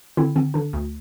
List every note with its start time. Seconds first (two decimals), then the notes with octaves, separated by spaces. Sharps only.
0.17 D3 C4 E4
0.36 D3 C4
0.54 D3 D4
0.73 D2